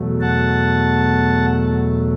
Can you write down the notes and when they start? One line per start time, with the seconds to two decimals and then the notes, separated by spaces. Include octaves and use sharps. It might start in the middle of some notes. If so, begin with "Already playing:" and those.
Already playing: E2 B2 F#3 A3
0.21 F#5 A5